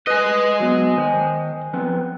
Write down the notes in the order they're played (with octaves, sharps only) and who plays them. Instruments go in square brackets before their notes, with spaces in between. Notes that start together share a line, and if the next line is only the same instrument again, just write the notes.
[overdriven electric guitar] G#4 D#5 [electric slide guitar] B4
[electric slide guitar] F#3 B3
D#3 C5
F3 B3 C4